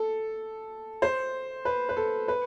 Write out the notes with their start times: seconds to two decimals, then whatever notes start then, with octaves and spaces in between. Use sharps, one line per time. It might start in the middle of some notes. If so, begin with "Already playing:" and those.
Already playing: A4
1.02 C5
1.65 B4
1.89 B4
1.97 A4
2.28 B4